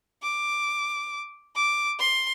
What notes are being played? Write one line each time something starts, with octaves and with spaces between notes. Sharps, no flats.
D6
D6
C6